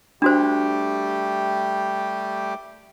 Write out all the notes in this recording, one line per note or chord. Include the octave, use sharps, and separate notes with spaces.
G3 A3 D4 F#4 G4 C5